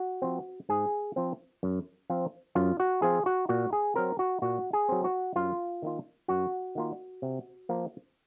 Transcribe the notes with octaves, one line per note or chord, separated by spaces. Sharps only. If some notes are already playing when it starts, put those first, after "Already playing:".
Already playing: F#4
F3 C4
G#2 G#4
F3 C4
F#2
F3 C4 F4
F#2 F4
F#4
F3 C4 F4 G#4
F#4
A#2 F#4
G#4
F#3 C4 A#4
F#4
A#2 F#4
G#4
F#3 C4
F#4
F#2 F4
D#3 A#3 F4
F#2 F#4
D#3 A#3 F4
C3
F3 A#3